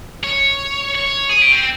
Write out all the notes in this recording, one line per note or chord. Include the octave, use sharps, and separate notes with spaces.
C#5
C#5
G#4
G4
C4